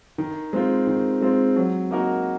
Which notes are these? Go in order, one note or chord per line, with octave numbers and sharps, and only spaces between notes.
D#3
G#3 C4 F4
D#3
G#3 C4 F4
F#3
A#3 D#4 F#4 A#4